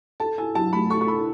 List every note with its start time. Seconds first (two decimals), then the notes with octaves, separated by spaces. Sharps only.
0.20 A4 A5
0.38 E4 G#5
0.55 F#3 A5
0.73 A3 B5
0.90 A4 C#6
1.01 C#6
1.08 E4 B5